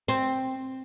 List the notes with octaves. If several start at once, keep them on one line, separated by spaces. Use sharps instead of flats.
C4